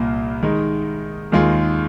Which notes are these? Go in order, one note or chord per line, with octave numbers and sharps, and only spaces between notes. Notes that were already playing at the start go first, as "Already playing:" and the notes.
Already playing: C2 A#2 A#3
D#3 G#3 D#4
D#2 D#3 G#3 F4 G#4